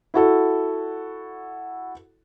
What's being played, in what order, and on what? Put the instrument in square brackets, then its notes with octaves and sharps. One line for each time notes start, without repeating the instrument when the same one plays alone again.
[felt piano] E4 F#4 A4